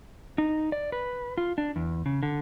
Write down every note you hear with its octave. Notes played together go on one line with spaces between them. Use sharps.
D#4
D5
B4
F4
D4
E2
C#3
D3